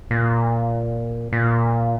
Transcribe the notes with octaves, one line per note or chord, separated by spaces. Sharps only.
A#2
A#2